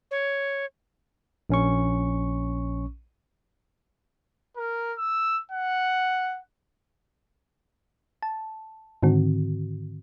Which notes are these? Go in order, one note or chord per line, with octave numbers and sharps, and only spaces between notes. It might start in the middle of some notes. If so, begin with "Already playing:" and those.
C#5
A#1 C#4 C#6
A#4
E6
F#5
A5
G#2 D3 D#3 C4 F#4